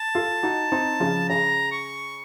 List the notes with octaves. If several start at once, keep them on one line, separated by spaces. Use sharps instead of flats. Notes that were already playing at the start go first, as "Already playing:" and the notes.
Already playing: A5
F4 A4
D#4 F#4
C4 D#4
C#3 F3
C#3 A#5
C#6